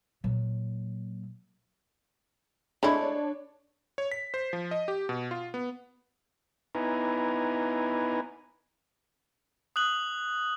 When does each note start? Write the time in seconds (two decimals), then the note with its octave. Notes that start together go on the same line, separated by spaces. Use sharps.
0.24 A#2 F#3
2.83 G#3 A3 D4 E4 C#5
3.98 C#5
4.11 B6
4.34 C5
4.53 F3
4.71 D#5
4.88 G4
5.09 B2
5.31 F4
5.54 B3
6.75 B3 D#4 E4 B4 G#5 A#5
9.76 D#6 F#6 F#7